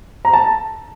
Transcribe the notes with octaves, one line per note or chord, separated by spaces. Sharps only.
A#5
A5